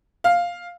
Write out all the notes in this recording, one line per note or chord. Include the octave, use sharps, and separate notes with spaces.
F5